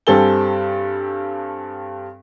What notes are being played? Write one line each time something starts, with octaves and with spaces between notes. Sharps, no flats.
G2 G3 C4 A4 G#5 G7